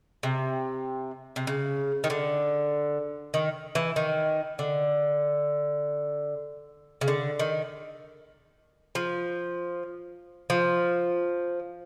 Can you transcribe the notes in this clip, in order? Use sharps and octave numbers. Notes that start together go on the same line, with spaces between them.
C3
C3
C#3
D#3
D3
D#3
E3
D#3
D3
C#3
D3
D#3
F3
F3